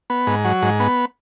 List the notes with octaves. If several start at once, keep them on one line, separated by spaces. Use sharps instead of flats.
B3
G#2
F#3
G#2
B3